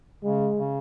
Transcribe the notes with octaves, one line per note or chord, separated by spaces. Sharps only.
C#3 G#3
C#3